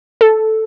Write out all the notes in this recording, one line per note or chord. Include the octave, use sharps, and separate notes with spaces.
A4